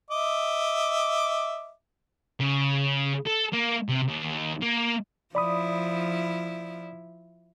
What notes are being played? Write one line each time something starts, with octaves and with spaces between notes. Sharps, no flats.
D#5 E5 D6
C#3
A4
A#3
C3
D#2
A#3
F3 E4 D5 B5 D#6